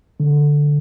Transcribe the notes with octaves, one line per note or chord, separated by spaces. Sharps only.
D3